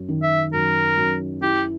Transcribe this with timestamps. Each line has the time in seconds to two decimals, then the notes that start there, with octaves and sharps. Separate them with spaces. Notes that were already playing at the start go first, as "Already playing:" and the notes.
Already playing: F#2
0.09 D#3
0.23 E5
0.53 F#2 A#4
0.97 F#2
1.41 E4 G4